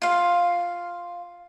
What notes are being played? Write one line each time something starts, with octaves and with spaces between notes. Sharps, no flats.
F4 F5